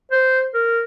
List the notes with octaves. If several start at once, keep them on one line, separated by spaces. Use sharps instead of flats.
C5
A#4